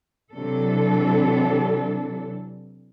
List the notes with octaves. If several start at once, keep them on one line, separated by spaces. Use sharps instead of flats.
C3 E3 F#3 D4 A4